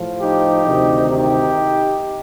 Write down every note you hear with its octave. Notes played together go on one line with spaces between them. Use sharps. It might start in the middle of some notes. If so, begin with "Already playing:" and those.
Already playing: A2 F3
D#4 G4
D2 C3 D#3
D#4 G4